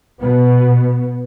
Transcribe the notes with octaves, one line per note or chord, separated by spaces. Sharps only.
B2 B3